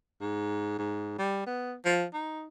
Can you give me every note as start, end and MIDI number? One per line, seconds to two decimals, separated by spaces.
0.21 0.78 44
0.78 1.16 44
1.18 1.42 55
1.46 1.74 59
1.85 2.05 53
2.14 2.47 63